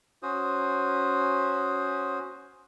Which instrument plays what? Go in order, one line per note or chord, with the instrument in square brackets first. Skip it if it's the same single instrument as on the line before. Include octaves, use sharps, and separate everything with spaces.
[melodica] C#4 F#4 C5 D#6